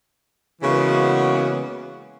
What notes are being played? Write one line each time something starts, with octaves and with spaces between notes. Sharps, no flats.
C#3 E3 G#3 A#3 B3 F#4